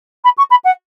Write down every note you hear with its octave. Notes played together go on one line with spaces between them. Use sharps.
B5
C#6
B5
F#5